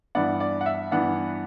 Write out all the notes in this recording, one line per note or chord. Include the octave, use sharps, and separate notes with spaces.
G2 E3 B3 D5 F#5
D5
F#5
E5
G2 E3 B3 D5 F#5